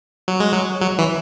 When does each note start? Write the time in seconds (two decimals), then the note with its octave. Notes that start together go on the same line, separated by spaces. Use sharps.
0.28 F#3
0.40 G#3
0.52 F#3
0.81 F#3
0.99 E3